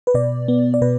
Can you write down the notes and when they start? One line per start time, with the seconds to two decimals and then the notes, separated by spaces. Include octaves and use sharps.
0.07 B4
0.14 B2 D5
0.48 B3
0.74 D5
0.82 B2 B4